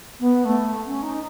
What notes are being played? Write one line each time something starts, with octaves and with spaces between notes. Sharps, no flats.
B3
A3
C#4
D#4